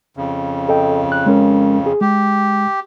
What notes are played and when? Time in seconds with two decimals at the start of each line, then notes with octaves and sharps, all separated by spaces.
0.17 F2 C#3
0.69 A4 D#5 G5
1.12 F#6
1.26 G#3 C#4 A#4
1.86 G#4
2.01 G#3 G4